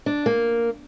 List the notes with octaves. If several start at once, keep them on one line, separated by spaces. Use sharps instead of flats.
D4
A#3